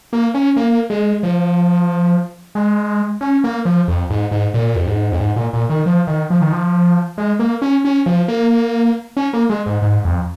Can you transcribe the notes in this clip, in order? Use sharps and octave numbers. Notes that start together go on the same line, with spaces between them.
A#3
C#4
A#3
G#3
F3
G#3
C#4
A#3
F3
F2
G#2
G#2
A#2
F2
G#2
F2
G#2
A#2
A#2
D#3
F3
D#3
F3
D#3
F3
G#3
A#3
C#4
C#4
F3
A#3
C#4
A#3
G#3
G#2
G#2
F2